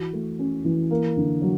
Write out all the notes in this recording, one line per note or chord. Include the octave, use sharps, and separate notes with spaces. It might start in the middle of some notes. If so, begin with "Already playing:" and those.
Already playing: E3 F#4
A3
C#4
E3
A#3
D3
F#3